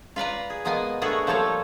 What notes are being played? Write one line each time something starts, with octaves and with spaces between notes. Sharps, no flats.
F4 B4 D5 A#5
G#4
B2 G#3 A#3 B3 D#5 G#5
A3 B3 D4 F#4 G#4 A#4
F3 G3 A#3 A4 C#5